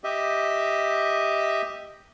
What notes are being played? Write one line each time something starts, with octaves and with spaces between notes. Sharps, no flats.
G4 D#5 E5